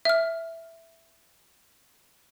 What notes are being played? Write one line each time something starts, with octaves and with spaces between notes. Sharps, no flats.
E5 F6